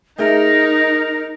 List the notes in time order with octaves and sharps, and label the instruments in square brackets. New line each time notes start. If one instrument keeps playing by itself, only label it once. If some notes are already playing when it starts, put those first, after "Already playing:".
[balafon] A3 G#4 E5 [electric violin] D#4 [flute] A#4